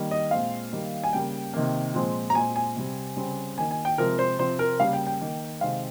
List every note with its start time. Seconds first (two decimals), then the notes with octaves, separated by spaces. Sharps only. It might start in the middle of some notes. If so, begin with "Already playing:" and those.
Already playing: D#3 G3 A#3
0.11 D#5
0.31 A#2 G#3 C4 F5
0.72 D#3 G3 A#3
1.04 G#5
1.13 C#3 G3 A#3 G5
1.54 C3 D#3 A#3
1.95 A#2 F3 G#3 C4
2.30 A#5
2.35 A#2 G#3 C4 G#5
2.56 G#5
2.76 C3 G3 C4
3.17 C#3 G3 C4
3.57 D#3 A#3 G#5
3.71 G#5
3.85 G5
3.98 C3 F3 G#3 C4 A#4
4.19 C5
4.39 C3 F3 C4 C5
4.59 A#4
4.80 C#3 G3 A#3 F5
4.93 G5
5.07 G5
5.21 D#3 A#3
5.61 C3 D#3 G#3 C4 F5